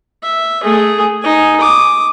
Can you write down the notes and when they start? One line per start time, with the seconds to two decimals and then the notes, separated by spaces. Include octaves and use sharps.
0.23 E5
0.63 A3 G#4
1.22 D#4 G#5
1.60 D6 D#6